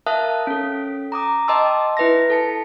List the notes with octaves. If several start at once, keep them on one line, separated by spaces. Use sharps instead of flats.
A#4 E5 F5 A5 D#6 F#6
C#4 A4
A#5 D6 D#6
D#5 G5 A5 C6 D6 E6
E4 B4 E5 A#6
A4 A5 C#7